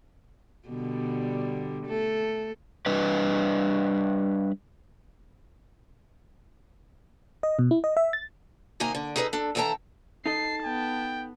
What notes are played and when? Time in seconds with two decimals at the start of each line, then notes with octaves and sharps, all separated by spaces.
0.68 B2 D3 G3
1.87 A3 A4
2.86 G3 D4 B4 D#5
7.43 D#5
7.59 B2
7.71 E4
7.84 D#5
7.97 E5
8.13 A6
8.80 C3 D#3 A#3 D#4 G#5 A#5
8.95 D3
9.16 D#4 G#4 A4 B4 C#5 D#5
9.33 D4 A4
9.55 D#2 E3 A4 G5 A5 A#5
10.26 D#4 A4 D#5 A5 C7
10.65 B3 G5